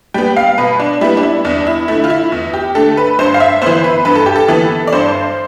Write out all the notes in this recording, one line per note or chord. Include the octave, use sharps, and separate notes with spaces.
G3 B3 G5
F5
B2 B4
D4
G3 B3 E4
D4
E4
E2 D4
E4
D3 A3 E4
F4
E4
E2
G4
D3 A3 A4
B4
G2 C5
F5
E5
E3 B3 C5
B4
G2 B4
A4
G4
A4
E3 B3
D5
G2 C5